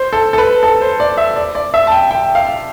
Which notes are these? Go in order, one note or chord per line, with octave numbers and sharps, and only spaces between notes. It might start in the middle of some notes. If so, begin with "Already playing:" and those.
Already playing: C5
A4
A4
B4
A4
C5
D5
E5
D5
D5
E5
A5
G5
G5
F5